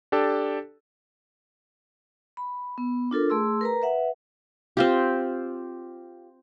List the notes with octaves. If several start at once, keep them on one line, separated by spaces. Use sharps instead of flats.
D4 G4 A4 A5
B5
B3
D4 F4 A4 A#4
A3 G#4 C6 E6
A#4 B4 A#5
B4 E5 F#5
C4 F4 G4